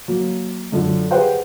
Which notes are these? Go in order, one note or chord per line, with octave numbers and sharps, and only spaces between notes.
F#3 A#3
F#2 D3 F4
G4 G#4 B4 C5 F#5 G5